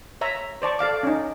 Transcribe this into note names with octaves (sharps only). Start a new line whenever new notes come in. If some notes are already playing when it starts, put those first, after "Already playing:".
C#5 E5 A#5
C5 D5 A5 C#6
A4 D5 F5 D6
C#4 D#4